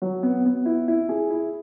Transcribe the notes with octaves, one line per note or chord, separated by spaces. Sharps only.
F#3
B3
B3
E4
E4
G#4
E4